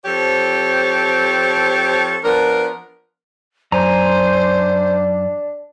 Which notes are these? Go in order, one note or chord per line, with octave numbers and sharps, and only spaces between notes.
F3 C4 G4 A4 C#5
F3 B3 D4 A#4
F#2 D4 C5 G#5 A#5